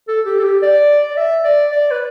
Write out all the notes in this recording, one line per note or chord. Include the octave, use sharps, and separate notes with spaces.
A4
G4
A4
G4
D5
D5
E5
D5
D5
B4